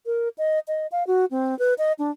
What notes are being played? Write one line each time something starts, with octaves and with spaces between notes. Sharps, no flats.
A#4
D#5
D#5
F5
F#4
C4
B4
D#5
D4